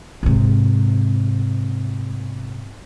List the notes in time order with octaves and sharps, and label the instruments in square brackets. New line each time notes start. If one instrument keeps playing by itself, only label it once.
[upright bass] G#2 C3